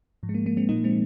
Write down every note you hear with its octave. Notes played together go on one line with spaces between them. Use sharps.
G#2 F3
G#3
A#3
A#3
G#3 C4
A#2 F3 A#3 D#4
G#3 C4